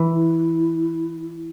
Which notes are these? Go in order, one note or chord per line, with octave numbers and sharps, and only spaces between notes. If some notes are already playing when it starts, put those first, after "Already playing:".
Already playing: E3
E4